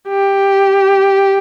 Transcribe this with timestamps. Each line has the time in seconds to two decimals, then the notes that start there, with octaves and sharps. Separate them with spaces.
0.09 G4